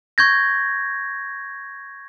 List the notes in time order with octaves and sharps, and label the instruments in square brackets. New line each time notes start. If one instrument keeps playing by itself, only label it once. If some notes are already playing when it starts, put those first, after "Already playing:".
[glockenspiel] C#6 G6 G#6 A#6